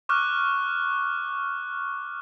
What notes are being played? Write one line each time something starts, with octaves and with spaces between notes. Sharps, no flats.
C#6 D6 F6 F#6